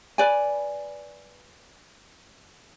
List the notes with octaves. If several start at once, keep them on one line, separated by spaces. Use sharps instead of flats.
B4 D5 G#5